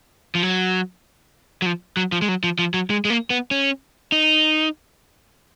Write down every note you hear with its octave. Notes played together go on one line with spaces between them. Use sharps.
F3
F#3
F#3
F3
F#3
F3
G#3
F#3
F3
F3
F#3
G#3
G#3
A#3
B3
C#4
D#4